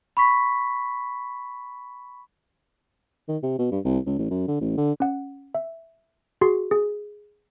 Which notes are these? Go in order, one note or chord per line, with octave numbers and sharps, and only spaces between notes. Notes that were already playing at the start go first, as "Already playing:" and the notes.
B5 C#6 B6
D#3
C3
B2
G2
C2
C#2
A1
F#2
D3
A1
D3
C#4 F#5
E5
F#4 G#4 C6 C7
G#4